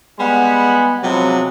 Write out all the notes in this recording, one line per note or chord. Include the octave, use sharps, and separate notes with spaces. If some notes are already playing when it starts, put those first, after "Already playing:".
G3 G#3 B3 F#5 G#5 B5
C3 F3 F#3 G#3 B3